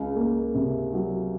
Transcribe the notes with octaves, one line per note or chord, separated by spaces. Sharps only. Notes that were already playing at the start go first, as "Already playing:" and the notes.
Already playing: C#2
A#3
C3
F#3